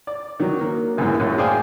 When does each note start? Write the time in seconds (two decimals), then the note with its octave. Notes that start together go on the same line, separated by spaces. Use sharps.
0.07 D5
0.40 D#3 F#3
0.61 A#3
0.97 G#1 F#2 A2 E3 G#3 A#3
1.20 A#1 F#2 A2
1.38 G#4 C5 D5 F5 G5 G#5